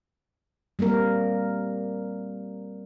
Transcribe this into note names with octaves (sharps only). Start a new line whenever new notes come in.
G3 A#3 C4 A#4